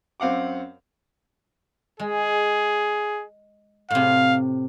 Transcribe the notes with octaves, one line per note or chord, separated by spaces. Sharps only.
F#2 C4 F5 F#5 D6
G#3 G#4
A2 C3 F5